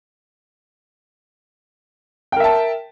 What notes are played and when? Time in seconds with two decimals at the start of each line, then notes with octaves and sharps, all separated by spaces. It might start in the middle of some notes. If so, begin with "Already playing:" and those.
2.32 G5
2.36 A#4
2.40 E5
2.44 A5